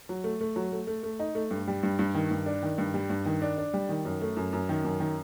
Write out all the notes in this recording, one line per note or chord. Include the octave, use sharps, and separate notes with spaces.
F#3
A3
A3
F#3
A3
A3
A3
D#4
A3
G2
G3
G2
G2
D#3
G2
D4
D#3
G2
G3
G2
D#3
D4
D4
G3
D#3
F#2
A3
F#2
F#2
D#3
F#2
D#3